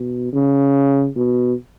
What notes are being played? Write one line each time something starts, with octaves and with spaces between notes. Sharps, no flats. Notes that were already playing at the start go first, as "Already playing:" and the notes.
Already playing: B2
C#3
B2